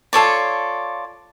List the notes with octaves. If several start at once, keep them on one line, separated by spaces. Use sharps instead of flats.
F4 A4 C#5 D5